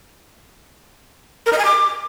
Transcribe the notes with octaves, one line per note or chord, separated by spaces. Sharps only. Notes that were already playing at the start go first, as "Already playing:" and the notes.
A#4
D#5
G#5
D6